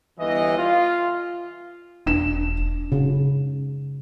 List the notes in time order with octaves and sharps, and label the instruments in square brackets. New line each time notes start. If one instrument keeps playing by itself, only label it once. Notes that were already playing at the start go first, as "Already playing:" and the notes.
[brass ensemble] G1 E3 D#5
F4
[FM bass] E1 [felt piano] D4 E7
[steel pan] C#3